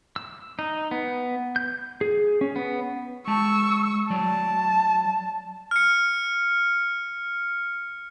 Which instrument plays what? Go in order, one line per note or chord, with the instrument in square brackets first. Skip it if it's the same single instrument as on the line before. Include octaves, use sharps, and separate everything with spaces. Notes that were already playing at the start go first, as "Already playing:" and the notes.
[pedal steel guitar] E6
D#4
B3
G6
G#4
C#4
B3
[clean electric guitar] G#3 A5 [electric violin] C#6 E6
[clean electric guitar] F#3 D5 [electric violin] A5
[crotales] F6 C#7